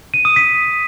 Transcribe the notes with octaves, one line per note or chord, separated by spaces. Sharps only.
D#7
D#6
B6